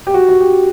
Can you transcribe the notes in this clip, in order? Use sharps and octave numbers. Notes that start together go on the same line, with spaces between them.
G4
F#4
F#4
G4